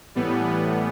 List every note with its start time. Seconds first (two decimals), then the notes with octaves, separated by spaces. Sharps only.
0.15 A2 E3 G3 B3
0.45 B3